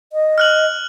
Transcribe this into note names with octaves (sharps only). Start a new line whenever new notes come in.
D#5
F6 F#6 F#7